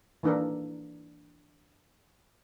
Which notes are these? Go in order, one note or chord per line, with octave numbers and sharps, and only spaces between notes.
E3 A#3 D4 A4 A#4